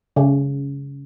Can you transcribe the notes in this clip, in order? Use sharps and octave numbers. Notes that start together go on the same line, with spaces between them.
C#3